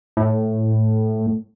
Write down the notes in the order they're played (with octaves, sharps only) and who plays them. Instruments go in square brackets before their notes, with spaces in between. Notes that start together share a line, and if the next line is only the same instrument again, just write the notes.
[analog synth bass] A2